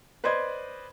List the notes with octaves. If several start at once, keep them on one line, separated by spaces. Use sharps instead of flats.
B4 C5 D5 D#5 C6 G#6